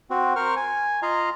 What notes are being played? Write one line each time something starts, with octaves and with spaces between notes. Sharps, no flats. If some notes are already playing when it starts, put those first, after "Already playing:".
C4 F#4
A#4 C5 C#6 F6
G#5
F4 D#5 F5 A#5